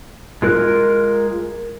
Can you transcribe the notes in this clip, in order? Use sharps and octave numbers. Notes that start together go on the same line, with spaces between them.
G#3 F4 A#4 F#6